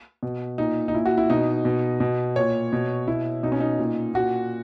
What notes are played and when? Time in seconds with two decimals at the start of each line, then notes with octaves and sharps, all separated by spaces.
0.23 B2
0.58 A#2 D#4
0.88 D#4
0.94 A#2 E4
1.05 F#4
1.18 E4
1.30 B2 D#4
1.65 B2
2.00 B2
2.36 A#2 C#5
2.73 B2
3.08 B2 E4
3.43 B2 D#4
3.52 C#4
3.61 D#4
3.79 A#2
4.14 A#2 F#4